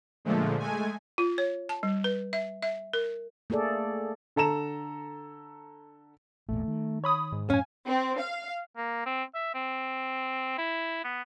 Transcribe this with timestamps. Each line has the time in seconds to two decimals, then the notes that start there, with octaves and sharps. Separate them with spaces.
0.25 A#2 D3 F3 G#3 A3
0.59 G#3 A3 G#5
1.18 F4
1.38 C#5
1.69 A5
1.83 G3
2.04 B4
2.33 E5
2.63 E5
2.93 A#4
3.50 A3 A#3 G#4 A4 D5
4.36 D3 A4 A#5 E7
6.49 A1 E2 A#2 A3
6.67 D#3
7.04 C#5 B5 D#6
7.32 G#2
7.50 F#2 A2 C#4 F5 G#5
7.86 C4
8.19 F5
8.77 A#3
9.06 C4
9.35 E5
9.55 C4
10.58 E4
11.04 B3